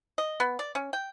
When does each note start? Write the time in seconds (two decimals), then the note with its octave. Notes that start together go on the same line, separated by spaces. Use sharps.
0.18 D#5
0.40 B3
0.59 D5
0.75 C#4
0.93 G5